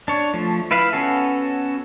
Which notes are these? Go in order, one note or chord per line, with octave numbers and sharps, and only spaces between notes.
D4 C#5
F3 A3
E4 B4 F5
B3 C#4 F#4 A4